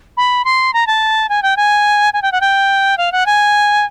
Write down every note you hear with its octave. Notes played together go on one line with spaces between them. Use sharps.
B5
C6
A#5
A5
G#5
G5
G#5
G#5
G5
F#5
G5
F5
F#5
G#5